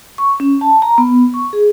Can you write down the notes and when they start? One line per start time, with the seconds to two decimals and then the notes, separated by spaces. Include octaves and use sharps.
0.18 C#6
0.40 C#4
0.61 A5
0.82 A#5
0.98 B3
1.34 C#6
1.53 G#4